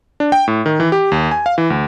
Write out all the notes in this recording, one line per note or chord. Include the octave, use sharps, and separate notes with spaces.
D4
G5
A2
D#3
E3
G4
D#2
G#5
F5
E3
D2